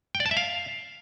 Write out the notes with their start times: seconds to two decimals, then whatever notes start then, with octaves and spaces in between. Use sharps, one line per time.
0.15 G5
0.20 D5
0.26 A5
0.31 E5
0.37 F5